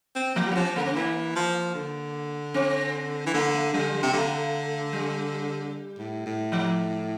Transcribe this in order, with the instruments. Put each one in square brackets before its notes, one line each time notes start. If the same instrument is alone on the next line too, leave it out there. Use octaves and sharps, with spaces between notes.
[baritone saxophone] C4
[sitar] F3 [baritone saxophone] A#3
[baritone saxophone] G3
[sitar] A#3
[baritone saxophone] F3 [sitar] C4
[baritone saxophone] D3 [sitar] A#3
[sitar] C4
[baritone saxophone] E3 [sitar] A#3
[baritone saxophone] F3
D3
[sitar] C4
[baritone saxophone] E3
[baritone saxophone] D3 [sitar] A#3
[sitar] A3
[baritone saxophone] D3 [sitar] G3
[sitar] G3
[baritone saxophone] C3
[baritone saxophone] D3 [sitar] A3
[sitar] G3
[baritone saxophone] A2
A2
[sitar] F3